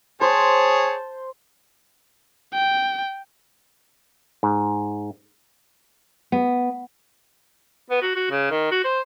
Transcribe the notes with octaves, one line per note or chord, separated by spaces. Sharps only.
G#4 C5 C#5 A5
G5
G#2
B3
B3
F#4
F#4
C#3
D#3
F#4
C5